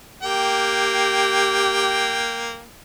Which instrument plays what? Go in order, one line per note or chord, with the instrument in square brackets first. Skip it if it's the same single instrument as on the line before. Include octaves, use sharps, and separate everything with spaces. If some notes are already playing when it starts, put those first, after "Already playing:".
[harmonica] A#3 G5 [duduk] G4